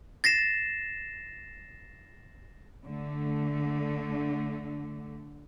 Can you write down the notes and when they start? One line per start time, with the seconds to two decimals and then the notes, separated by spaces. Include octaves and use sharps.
0.24 A6 A#6 C7 E7
2.84 D3 A3